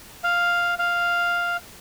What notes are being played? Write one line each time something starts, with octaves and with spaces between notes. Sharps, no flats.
F5
F5